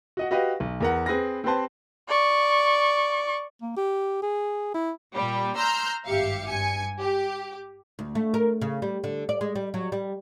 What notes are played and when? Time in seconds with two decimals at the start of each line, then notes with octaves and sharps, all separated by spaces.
0.17 F#4 D#5 F#5
0.31 F#4 G4 B4 D#5 F5
0.60 B1
0.80 E2 A#4 F#5
1.06 C4 G#4 B4 A#6
1.44 C4 G4 B4 C5 A5
2.09 D5 C#6
3.62 A#3
3.77 G4
4.23 G#4
4.74 E4
5.13 A#2 G3
5.55 A#5 C6 E6 F6 G6
6.06 G#1 G2 G4 E5 F5 C#7
6.49 G2 G#5 C#7
7.02 G4
7.99 D2
8.15 A3
8.34 A#4
8.61 C#3
8.82 G3
9.04 D3
9.29 D5
9.41 G#3
9.55 G3
9.74 F#3
9.92 G3